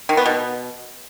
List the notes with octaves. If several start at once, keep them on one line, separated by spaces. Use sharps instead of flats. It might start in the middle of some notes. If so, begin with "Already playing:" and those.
D#3
B3
B2